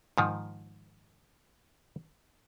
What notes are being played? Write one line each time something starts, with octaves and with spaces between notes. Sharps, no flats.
G#2 D#3 F3